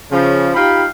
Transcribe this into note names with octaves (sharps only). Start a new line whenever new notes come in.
C#3 F3
D#4 F4 G4 F5 G5 B5